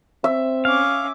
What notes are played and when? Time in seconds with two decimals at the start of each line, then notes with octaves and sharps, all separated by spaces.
0.24 C4 E5
0.65 C#4 F5 D6